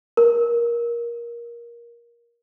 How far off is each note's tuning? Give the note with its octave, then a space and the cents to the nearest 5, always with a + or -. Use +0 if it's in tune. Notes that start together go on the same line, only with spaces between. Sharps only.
A#4 +20